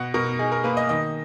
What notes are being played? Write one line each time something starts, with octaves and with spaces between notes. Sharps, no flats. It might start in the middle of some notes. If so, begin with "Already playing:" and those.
Already playing: B2 F#5
B2 A#4
D#4 G#4
A#4
A#3 B4
D#5
D#3 D#5